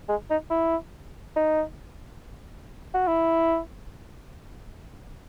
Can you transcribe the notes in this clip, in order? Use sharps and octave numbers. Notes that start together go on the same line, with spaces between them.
G#3
D#4
E4
D#4
F#4
E4